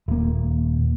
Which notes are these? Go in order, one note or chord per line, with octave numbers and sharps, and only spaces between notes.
D#1 A#3